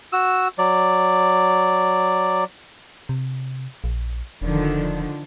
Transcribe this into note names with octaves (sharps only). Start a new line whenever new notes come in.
F#4 E6
F#3 D5
C3
A#1
E1 D3 D#3 F3